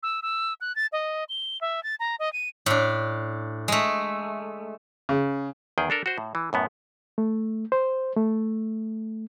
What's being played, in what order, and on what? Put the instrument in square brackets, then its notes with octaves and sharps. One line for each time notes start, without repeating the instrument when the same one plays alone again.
[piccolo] E6
E6
F#6
A6
D#5
G7
E5
A6
A#5
D#5
D#7
[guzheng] A2 D4
G#3 A3
[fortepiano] C#3
[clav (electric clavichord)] E2 D#3 G#4 G5
D4 A4 A#4
F#4 C5
A2
E3
F#2 A2 B3
[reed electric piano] A3
C5
A3